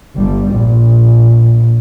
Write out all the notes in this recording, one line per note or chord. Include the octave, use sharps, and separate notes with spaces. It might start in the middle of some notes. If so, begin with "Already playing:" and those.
G1 G3
A#1